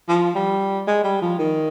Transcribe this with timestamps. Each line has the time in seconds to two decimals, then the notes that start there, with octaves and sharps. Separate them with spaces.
0.09 F3
0.35 G3
0.87 G#3
1.04 G3
1.22 F3
1.39 D#3